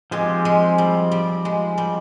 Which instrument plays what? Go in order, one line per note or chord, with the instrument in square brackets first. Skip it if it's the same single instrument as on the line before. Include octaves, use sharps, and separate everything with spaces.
[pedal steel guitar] F3 C4 G4 [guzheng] G#3
[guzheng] G#3
G3
G3
G#3
G3